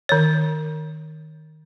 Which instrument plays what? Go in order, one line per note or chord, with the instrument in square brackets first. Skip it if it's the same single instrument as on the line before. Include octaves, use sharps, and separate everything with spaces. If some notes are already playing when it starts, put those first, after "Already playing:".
[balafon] D#3 C#5